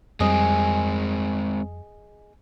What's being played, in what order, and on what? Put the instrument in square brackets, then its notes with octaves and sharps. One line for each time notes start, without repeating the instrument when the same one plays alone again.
[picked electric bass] F2 G3 [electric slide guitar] G#3 C4 [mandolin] G#4 D#5